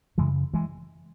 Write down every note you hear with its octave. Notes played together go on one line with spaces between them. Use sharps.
F#2 C#3 E3 G#3
E3 G#3